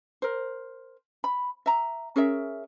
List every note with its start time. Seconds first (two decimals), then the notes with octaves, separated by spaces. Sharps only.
0.22 A#4 C5
1.24 B5
1.66 E5 A#5
2.16 C#4 G#4 A#4 E5